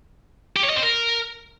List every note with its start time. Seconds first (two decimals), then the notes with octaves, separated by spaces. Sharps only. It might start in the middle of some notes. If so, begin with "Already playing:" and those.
0.56 G4
0.63 C#5
0.70 D#5
0.76 C4
0.83 A#4